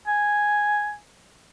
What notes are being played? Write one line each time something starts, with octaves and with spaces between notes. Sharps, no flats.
G#5